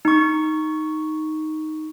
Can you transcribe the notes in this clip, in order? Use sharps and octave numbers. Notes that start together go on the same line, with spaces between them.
D#4 C#6